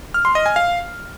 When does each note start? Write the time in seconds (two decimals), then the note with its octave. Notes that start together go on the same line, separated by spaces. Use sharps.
0.14 F6
0.25 C6
0.35 D#5
0.46 G#5
0.56 F5